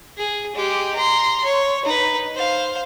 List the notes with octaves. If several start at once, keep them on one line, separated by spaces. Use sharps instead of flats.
G#4
G#3 G4
A#5 C6
C#5
D#4 B4
C5 F5